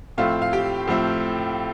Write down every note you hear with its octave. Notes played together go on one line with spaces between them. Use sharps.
A2 F3 A3 C4 F4 F5
F5
G4 G5
A2 F3 A3 C4